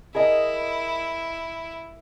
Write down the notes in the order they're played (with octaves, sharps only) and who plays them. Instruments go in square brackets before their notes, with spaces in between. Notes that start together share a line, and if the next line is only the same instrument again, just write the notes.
[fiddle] E4 [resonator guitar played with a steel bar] G#4 A#4 D#5